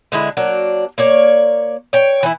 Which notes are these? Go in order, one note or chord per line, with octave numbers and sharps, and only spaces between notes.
D3 G#3 E4
F#3 A#3 D4
A#3 C#5 D5
C#5 G5
E3 E4